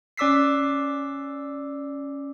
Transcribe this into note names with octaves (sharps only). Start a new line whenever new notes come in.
C#4 D5 D6 E6 B6 C7